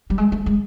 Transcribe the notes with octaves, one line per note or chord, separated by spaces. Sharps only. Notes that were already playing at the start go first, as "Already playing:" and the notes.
G3
G#3
A3
G#3